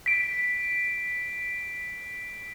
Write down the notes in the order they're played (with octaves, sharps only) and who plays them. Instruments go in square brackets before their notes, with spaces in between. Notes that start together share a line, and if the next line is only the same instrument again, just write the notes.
[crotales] B6 D7